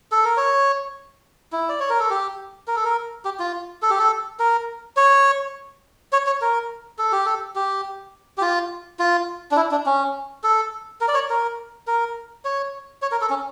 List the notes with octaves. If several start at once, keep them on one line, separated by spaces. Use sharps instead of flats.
A4
A#4
C#5
E4
D5
C#5
A#4
A4
G4
A#4
A4
A#4
G4
F4
A4
G4
A4
A#4
C#5
C#5
C#5
A#4
A4
G4
A4
G4
G4
F4
F4
D4
E4
D4
C#4
A4
A#4
D5
C#5
A#4
A#4
C#5
C#5
A#4
A4
C#4